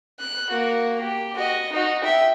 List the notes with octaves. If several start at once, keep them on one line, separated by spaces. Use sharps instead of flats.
F#6
A#3 F#4
G4
F#4 D#5
D#4 F#4
E5 G5